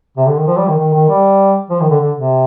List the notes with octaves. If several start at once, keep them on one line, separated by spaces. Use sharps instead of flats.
C3
D3
D#3
F3
G3
D#3
D#3
D#3
G3
F3
D#3
D3
D3
C3